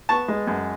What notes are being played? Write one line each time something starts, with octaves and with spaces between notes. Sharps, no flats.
B3 A5 C#6
G#3
F#2